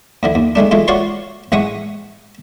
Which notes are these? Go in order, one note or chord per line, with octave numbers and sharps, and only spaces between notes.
D2 D3 E3
D#2
D#3 G#3 A3 D4
E3 G#3 A3 F4
F4 F#4 C#5 D5 C6 C#6
A1 G#3 E5 F#5 C#6 D#6